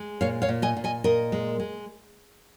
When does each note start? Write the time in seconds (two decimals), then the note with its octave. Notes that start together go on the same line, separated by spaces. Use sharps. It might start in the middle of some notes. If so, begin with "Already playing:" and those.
Already playing: G#3
0.21 A#2 C#5 F5
0.42 C#5 F5
0.48 A#2
0.62 D#5 G#5
0.77 A#2
0.84 D#5 G#5
1.04 A#2 A#4 D#5
1.32 G#3
1.60 G#3